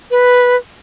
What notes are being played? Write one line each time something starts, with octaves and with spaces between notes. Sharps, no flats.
B4